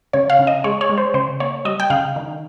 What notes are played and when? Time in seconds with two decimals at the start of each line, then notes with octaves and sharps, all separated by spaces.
0.13 C#3 C#5
0.30 F5
0.39 C#3
0.47 D#5
0.64 G#3 C#5
0.81 C#5
0.89 G#3
0.98 C5
1.14 C#3 C5
1.40 A#3 C#5
1.65 G3 D#5
1.80 G5
1.90 C#3 F5
2.16 D#3